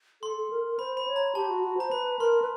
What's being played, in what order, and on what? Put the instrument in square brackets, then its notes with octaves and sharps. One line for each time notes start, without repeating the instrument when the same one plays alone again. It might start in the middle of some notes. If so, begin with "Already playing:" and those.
[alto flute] A4 [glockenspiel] C6
[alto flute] A4
A#4
A#4
[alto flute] C5 [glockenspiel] B5
[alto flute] C5 [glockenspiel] B5
[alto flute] C#5
[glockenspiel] A#5
[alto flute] G4 [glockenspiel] A5
[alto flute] F#4
F#4
[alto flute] C5 [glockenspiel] A#5
[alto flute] B4 [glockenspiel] B5
[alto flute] A#4 [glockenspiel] C6
[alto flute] B4